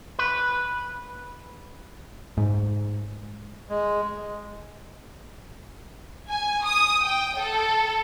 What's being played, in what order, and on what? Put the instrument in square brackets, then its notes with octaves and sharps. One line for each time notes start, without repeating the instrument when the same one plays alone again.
[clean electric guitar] B4
[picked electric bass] G#2
[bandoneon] G#3
[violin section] G#5
D#6
G5
A4